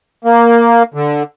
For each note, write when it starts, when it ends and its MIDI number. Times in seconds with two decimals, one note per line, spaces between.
0.25 0.83 58
0.94 1.23 50